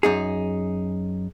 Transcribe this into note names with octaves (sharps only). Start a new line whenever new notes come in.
F#2 D#4 G#4